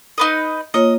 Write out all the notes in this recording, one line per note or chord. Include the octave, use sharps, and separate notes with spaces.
D#4 B4 D#5
A#3 F4 C#5 D#5